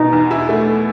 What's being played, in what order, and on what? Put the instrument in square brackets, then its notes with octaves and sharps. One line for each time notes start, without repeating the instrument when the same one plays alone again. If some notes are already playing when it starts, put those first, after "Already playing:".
Already playing: [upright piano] B2 [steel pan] D#4
[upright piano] E2
E4
A3